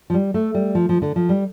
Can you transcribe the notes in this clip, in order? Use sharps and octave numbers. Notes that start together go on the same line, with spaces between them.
F3
G3
A3
G3
F3
F3
D3
F3
G3